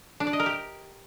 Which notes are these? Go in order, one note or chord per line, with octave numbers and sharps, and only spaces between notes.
D4
D5
D#5
A#4
G4